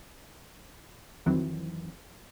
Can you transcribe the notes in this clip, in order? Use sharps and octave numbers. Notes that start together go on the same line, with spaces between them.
F2 D#3 E3 F#3 C4